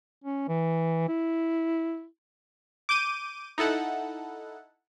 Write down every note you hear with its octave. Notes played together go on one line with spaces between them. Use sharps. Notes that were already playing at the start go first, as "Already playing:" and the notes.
C#4
E3
E4
D6 G6 D#7
D#4 E4 A4 F#5